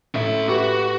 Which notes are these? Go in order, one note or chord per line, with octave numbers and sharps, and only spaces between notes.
A2 C#4 E5
F#4 G4 B4 D6